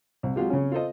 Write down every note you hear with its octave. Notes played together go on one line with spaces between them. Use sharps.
C2
F#3 G#3 F4 G4
C#3 C#4
F4 A4 C5 D#5